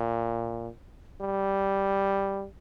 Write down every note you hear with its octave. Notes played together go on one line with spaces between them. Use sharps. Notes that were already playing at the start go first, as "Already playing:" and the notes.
Already playing: A#2
G3